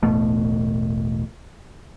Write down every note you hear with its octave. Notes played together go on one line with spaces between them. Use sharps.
E1 A1 B2 A3